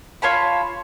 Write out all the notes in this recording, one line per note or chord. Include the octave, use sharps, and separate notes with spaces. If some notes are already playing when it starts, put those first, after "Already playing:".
F4 C#5 A5 B5